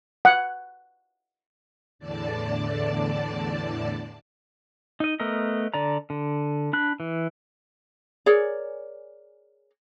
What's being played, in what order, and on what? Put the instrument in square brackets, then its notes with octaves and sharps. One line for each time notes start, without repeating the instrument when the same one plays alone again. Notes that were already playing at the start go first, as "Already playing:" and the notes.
[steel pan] F#5
[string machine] E2 A2 D3 D5 A5
[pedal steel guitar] D#4 D#5
A3 B3 A#4 D#5
D3 D5 A#5
D3
D4 B5 F#6
E3
[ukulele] G#4 A#4 C#5 D5